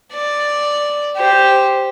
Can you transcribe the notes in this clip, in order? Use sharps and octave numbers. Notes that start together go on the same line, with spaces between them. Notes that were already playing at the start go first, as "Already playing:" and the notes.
D5
G4 C5